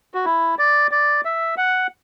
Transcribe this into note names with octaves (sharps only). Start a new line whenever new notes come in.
F#4
E4
D5
D5
E5
F#5